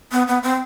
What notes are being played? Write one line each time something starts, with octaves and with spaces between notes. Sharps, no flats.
B3
B3
C4